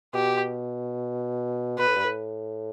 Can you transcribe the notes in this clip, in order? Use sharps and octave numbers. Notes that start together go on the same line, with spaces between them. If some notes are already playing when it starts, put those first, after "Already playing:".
B2 G4
B2 B4
A2
G2
A2